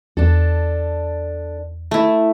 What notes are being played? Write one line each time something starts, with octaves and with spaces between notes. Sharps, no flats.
E2 D4 A4
A3 E4